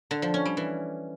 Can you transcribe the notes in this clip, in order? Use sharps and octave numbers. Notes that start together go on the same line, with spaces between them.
D3
F3
C#4
G3
E3